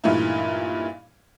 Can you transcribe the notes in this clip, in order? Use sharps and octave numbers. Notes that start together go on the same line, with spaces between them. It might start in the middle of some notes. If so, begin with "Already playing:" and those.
G2 A#2 E3 A3 D#4 E4